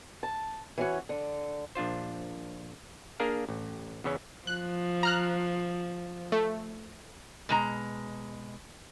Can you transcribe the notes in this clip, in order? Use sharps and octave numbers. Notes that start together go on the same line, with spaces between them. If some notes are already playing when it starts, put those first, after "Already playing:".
A5
E3 C#4 F#4
D3
A#1 D4 F4 C5
A#3 D4 G#4 A#4 F5
A1
E2 C#3 E3 C#4
F3 F#6
A#5 F6 F#6
A3
B2 G#3 A#5